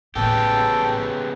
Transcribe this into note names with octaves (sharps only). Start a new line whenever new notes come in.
A1 A2 C#3 B3 G4 A4 G5